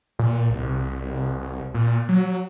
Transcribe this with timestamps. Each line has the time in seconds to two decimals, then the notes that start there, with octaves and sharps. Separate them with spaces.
0.19 A#2
0.50 C2
1.74 A#2
2.09 F#3